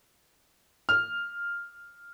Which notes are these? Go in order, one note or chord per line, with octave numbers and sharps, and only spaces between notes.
F6